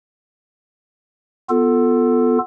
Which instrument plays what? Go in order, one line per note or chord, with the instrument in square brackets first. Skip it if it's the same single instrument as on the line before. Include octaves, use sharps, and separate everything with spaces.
[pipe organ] B3 F4 A4